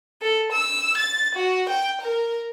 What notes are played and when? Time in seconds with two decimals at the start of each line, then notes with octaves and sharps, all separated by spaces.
0.22 A4
0.52 E6
0.97 A6
1.34 F#4
1.69 G5
2.01 A#4